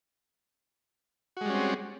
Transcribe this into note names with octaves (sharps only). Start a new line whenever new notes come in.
G3 G#3 C4 C#4 F#4